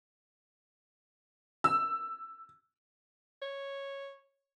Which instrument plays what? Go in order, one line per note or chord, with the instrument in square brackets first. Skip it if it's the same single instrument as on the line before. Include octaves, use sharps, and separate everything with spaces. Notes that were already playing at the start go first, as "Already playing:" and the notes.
[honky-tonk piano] E6
[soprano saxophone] C#5